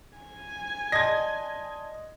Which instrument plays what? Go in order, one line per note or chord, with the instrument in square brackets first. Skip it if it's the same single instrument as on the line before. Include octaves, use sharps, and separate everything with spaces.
[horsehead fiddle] G#5
[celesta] D5 A5 C6 [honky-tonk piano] D#5 [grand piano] G#6 A#6